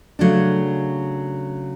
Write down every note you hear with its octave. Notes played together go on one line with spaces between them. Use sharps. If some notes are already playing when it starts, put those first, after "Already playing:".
C#3 F#3 A3 D4